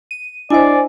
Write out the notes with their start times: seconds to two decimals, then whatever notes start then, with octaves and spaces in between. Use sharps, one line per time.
0.11 D#7
0.50 D4 E4 C5 D5 D#5 G#5